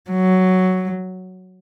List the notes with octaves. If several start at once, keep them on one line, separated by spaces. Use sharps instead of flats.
F#3